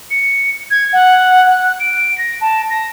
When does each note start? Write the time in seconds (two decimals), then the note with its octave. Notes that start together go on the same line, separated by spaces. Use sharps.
0.11 C#7
0.71 G#6
0.93 F#5
1.50 F#6
1.80 D7
2.18 A#6
2.41 A5
2.70 A#6